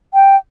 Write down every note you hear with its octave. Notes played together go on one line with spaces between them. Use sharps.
G5